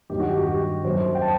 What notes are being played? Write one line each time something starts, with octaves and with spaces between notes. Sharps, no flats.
G2 D#3 F#3 G4
F#4
G4
F#4
G4
F#2 F#3 C5
G5
A5